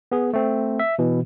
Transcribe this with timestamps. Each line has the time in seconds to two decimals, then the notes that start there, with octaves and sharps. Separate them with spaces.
0.12 B3 G#4
0.33 A3 C4
0.79 E5
0.99 B2 E3